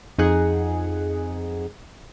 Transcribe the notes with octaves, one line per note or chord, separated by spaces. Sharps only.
F2 D#4 G#4 F#5